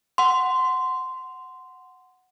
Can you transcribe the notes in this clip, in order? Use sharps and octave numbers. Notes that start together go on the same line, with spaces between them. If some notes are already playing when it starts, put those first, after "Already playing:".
F#5 C6